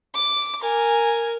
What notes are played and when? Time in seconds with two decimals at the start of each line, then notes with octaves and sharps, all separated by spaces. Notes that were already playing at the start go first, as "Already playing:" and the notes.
0.15 D6
0.60 A#4 G#5